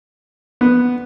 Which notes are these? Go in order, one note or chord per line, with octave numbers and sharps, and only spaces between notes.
B3